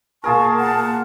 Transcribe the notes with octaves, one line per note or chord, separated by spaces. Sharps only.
B2 A#3 F4 G#4 A#4 A5 C#6
F#5